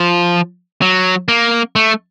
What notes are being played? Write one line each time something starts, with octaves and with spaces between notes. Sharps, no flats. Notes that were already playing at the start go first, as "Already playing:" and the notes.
Already playing: F3
F#3
A#3
A3